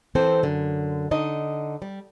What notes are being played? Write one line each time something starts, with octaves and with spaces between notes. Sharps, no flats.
E3 C4 A4 C5
F#2 D3
D3 D#4 D#5
G3